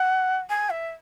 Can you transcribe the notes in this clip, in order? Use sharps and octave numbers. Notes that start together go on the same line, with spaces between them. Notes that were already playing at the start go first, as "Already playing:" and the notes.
Already playing: F#5
G#5
E5